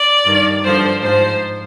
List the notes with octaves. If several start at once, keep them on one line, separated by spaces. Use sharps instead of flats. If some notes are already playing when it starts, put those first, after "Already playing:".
Already playing: D5
G2 D#3
G2 D3 F3 C5
G#2 F3 C5